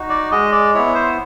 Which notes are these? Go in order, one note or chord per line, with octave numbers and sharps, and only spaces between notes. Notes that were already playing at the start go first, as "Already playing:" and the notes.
Already playing: D#4 F#4
D5
G#3 D#5
D5
B3 E4 C#5
C5